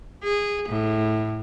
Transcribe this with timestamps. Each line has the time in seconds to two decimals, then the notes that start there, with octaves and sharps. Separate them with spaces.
0.24 G#4
0.69 A2